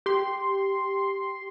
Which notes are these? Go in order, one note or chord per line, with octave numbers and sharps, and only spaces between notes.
G4 C6